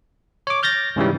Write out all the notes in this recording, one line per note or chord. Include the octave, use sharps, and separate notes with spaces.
C#5 D6
F6 G6 A6 A#6
G#2 C#3 E3 G3